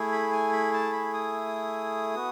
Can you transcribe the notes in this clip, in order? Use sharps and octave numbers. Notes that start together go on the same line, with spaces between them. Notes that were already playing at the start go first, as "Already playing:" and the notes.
Already playing: A3 E4 G#4
B5
G#5
B5
A5
B5
D#6
B3 F#4